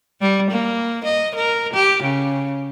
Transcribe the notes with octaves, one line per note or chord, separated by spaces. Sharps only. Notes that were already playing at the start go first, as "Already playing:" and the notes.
G3
A#3
D#5
A#4
G4
C#3